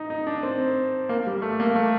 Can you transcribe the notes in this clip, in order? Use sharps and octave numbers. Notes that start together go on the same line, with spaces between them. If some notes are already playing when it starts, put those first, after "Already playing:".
Already playing: D#4
D#4
D4
C4
A#3
G3
A3
A#3
A3